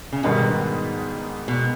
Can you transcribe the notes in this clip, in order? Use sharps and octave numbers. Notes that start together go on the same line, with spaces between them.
C#3
G#2 B2 D#3 G3 B3 D#4
B2